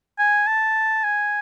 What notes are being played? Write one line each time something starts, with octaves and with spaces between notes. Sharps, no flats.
G#5
A5
G#5